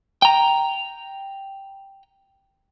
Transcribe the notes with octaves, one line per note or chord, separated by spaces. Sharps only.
G5 A#5